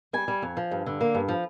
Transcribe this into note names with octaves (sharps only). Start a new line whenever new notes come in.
G3 G#5
G3
F2
F3
G2
D3
A#3
G2
F3